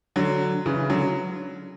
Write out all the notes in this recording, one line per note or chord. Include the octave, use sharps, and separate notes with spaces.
D3 F#3
C#3 E3
D3 F#3